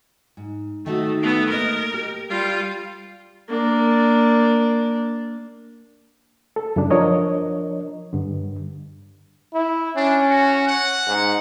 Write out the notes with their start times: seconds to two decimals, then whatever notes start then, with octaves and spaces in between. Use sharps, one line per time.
0.37 G#2
0.86 D#3 A3 D#4 F#4
1.21 A3 B3
1.50 A#3 A#4 D#5
1.94 G4
2.29 G3 F4
3.48 A#3 D4
6.56 A4
6.76 F#2 C#3 G3 D4
6.90 F3 D4 A#4 C#5 D#5
8.13 G2 D3
9.54 E4
9.96 C#4 D4
10.29 F#4
10.67 F#5
11.07 G#2